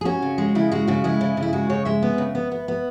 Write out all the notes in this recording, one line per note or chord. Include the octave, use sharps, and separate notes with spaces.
G#4
C#4 F#4
C#3
G#3
C#3 E4
G#3 F#4
C#3 F#4
G#3 E4
C#3
C#3
E4
G#3 F#4
C#3 C#5
G#3 E5
B3
C#3
B3
B3
B3